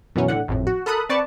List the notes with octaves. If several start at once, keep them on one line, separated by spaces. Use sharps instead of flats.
F#2 B2 E3 F#3 C#4
A2 D3 F#5
G#1 F2 A2
F#4
A4 A#4 B5 D#6 F#6
C4 B4 D5 A5 C#6